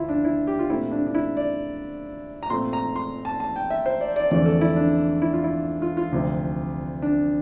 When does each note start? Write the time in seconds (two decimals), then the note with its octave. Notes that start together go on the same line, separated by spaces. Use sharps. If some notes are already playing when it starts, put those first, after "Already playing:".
Already playing: D2 E4 F4
0.09 D4
0.25 E4
0.47 G4
0.59 F4
0.69 A#2 A3 C4 E4
0.91 D4
1.06 D4
1.15 E4
1.37 D5
2.43 A#5
2.50 A#2 A3 C4 C6
2.73 A#5
2.96 C6
3.25 A5
3.40 A5
3.56 G5
3.70 E5
3.86 C5
4.01 D5
4.16 D5
4.31 E2 D3 F3 A3 C4 D5
4.46 A4
4.61 E4
4.76 D4
5.22 E4
5.34 F4
5.44 E4
5.82 F4
5.97 F4
6.12 D2 C3 F3 C4
7.02 D4